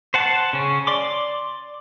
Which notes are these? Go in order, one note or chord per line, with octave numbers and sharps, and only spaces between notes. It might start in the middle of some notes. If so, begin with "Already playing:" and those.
C5 F#5 A5
C#3 C#4
D5 C6 D6